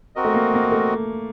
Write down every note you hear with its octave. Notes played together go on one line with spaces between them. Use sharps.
C4 F#4 A#4 D#5
A3
A#3
A#3
A3